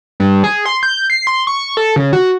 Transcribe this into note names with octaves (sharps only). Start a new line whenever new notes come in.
G2
G#4
C6
G6
C7
C6
C#6
A4
C#3
F#4